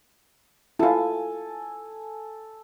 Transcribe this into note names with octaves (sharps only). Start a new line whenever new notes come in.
E4 F4 A4 G#5